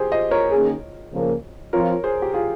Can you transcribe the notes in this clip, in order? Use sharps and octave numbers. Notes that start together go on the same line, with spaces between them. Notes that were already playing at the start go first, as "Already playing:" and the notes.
Already playing: G4 G#4 C5
C5 D#5
A#4 C#5
D#3 A#3 C#4 G#4
C#3 F3 A#3
F3 C4 F4 A#4 C#5
G#4 C5
G4
F4 G#4